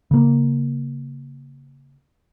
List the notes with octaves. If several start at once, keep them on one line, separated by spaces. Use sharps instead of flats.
C#3 A#3